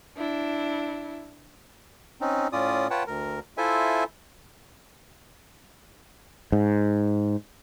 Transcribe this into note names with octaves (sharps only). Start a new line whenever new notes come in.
D4 E4
C4 C#4 D#4
A2 C#4 F4 D5 D#6
F4 B4 C#5 F#5 G5 A5
D2 A#4
E4 F4 A4 C5 E5 G#5
G#2